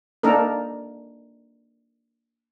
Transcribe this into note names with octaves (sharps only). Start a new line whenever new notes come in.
A#3 D4 D#4 A4 A#4